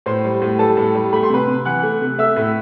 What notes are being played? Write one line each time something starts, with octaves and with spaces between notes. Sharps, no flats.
A2 C5 C6
G3
A2
G3 A4 A5
A2
G3
A3 B5
C6
C3 B4 B5
C3
E3 F#5 F#6
A3
C3
A3 E5 E6
A2